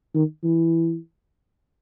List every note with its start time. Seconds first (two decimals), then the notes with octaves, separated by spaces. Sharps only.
0.14 D#3
0.44 E3